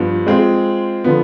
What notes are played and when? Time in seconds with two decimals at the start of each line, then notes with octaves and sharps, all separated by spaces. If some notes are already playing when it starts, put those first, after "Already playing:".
Already playing: G2 F3 B3
0.27 G#3 C4 F4 G#4
1.04 D3 F3 B3